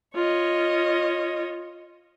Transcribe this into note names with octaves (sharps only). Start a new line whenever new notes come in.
F4 C#5 D#5